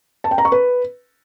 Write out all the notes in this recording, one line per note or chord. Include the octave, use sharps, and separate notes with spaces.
A5
G5
A#5
C#6
B4